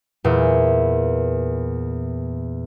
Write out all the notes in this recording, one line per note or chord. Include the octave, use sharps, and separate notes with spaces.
E2 A#2 B3